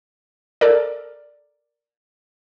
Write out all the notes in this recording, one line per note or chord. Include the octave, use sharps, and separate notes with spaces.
A4 A#4 D5